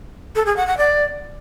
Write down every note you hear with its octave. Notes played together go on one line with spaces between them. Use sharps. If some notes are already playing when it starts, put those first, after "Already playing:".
A4
G#4
F#5
F#5
D5